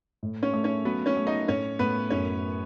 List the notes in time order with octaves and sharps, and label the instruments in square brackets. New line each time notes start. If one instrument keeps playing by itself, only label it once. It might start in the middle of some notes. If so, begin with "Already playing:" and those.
[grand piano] A2
[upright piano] C#4 C#5
[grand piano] A3
[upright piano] C#4 C#5
[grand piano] F#3 [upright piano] B3 B4
[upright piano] C#4 C#5
[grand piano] A3
[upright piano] D#4 D#5
[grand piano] A2 [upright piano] C#4 C#5
[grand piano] A2 [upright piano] B3 B4
[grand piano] F#2 [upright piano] C#4 C#5